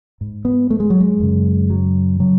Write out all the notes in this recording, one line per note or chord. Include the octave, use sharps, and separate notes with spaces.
G#2
B3
A3
G#3
F#3
G#3
F#2 C#3
F#3
C#3 F#3